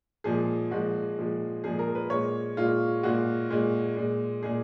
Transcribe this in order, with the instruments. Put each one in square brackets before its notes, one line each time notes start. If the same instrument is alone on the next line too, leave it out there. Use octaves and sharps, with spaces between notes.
[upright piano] A#2 F3 G#3 G#4
A#2 F3 G#3 F#4
A#2 F3 G#3
A#2 F3 G#3 G#4
A#4
B4
A#2 G#3 C#5
A#2 G#3 F4
A#2 G#3 F#4
A#2 G#3
A#2 G#3
A#2 G#3 G#4